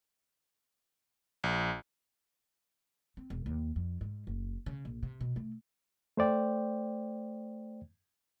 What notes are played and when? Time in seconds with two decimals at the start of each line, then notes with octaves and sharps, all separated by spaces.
1.44 A#1
3.17 C4
3.30 E1
3.46 D#2
3.76 F2
4.01 G#2
4.27 F#1
4.66 C#3
4.85 A#1
5.03 C3
5.21 B2
5.36 A3
6.17 A3 C5 D5 G5